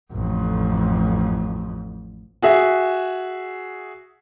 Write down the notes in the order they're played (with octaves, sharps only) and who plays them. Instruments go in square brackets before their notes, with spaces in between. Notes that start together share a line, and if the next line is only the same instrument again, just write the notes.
[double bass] A1 F2
[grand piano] F#4 G#4 E5